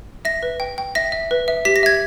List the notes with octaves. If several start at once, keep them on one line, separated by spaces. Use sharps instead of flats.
E5 A#6
B4
G5
G5
E5 A#6
E5
B4
E5
G4 B6
A#6
E5 G#6